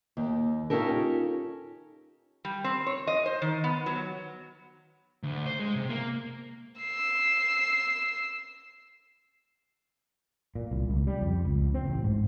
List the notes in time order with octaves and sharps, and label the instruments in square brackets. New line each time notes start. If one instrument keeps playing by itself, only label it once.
[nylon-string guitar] D#2
C#4 D#4 F4 G4 A4 A#4
[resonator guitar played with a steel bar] G3
C4
C#5
D#5
C5
D#3
B3
F#3
[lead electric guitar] D2
C5
G#3
C3
A#3
[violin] E6 C7
[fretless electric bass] A#2
C2
C#2
G3
F2
C#2
C4
A1
G#2